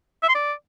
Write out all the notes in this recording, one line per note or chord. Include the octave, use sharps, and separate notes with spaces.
E5
C6
D5